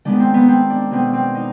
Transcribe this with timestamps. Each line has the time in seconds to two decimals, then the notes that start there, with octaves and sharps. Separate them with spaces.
0.05 D#3 G#3 B3 D4
0.20 C4
0.34 B3
0.48 C4
0.70 D4
0.91 B2 B3 C4
1.13 C4
1.35 D#4